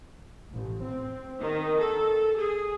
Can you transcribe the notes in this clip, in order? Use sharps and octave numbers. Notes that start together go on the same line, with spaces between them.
A1
C4
D#3
A4
G#4